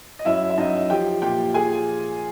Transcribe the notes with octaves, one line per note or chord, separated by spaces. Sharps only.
D#5
F#2 E4 E5
E5
F#2 D#4 D#5
F3 G4 G5
A#2 G4 G5
F3 G#4 G#5